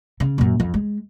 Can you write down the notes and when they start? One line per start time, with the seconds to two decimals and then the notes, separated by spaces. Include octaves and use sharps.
0.20 C#3
0.38 F#2 A#2
0.60 F2
0.74 G#3